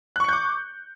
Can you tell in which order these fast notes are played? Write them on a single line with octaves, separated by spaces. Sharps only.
F#6 C#6 C#7 G6 D6